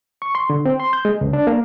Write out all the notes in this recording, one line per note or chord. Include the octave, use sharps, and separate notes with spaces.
C#6
C6
D3
C4
C6
G6
G#3
C#2
D4
A#3